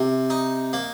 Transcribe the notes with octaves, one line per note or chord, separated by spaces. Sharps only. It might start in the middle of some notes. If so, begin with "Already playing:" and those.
Already playing: C3
D#4
A#3